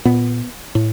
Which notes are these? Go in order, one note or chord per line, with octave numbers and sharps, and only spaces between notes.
A#2 B3
A2